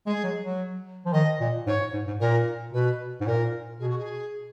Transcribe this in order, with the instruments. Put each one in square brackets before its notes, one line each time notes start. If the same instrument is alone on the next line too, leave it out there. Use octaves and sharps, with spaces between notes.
[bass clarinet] G#3 [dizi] G#4
[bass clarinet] F#3
F#3
F3
[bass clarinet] D#3 [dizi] D#5
[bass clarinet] A#2
[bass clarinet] G#2 [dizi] C#5
[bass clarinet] G#2
G#2
[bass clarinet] A#2 [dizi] A#4
[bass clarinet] B2 [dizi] B4
[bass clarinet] G#2
[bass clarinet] A#2 [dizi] A#4
[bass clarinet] B2 [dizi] G#4
[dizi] F#4
G#4